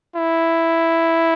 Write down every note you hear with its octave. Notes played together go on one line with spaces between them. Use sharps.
E4